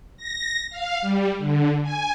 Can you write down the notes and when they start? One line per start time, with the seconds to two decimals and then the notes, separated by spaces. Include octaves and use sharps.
0.17 A#6
0.70 F5
1.01 G3
1.38 D3
1.83 G#5